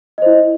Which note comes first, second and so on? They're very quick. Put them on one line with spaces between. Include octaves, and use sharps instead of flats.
D#5 C5 E4